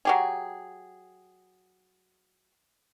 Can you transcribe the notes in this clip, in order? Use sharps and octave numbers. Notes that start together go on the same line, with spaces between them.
F#3 G4 G#4